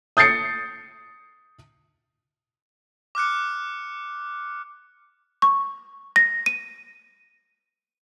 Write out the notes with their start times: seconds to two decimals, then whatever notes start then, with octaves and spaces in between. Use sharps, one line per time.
0.17 D#6 G6 A6 C7 C#7
3.15 D6 F6 F#6 C#7
5.42 C#6
6.16 A#6
6.46 D#7